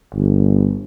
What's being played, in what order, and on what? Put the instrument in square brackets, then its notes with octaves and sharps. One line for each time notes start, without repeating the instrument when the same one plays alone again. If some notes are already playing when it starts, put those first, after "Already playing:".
[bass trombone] G1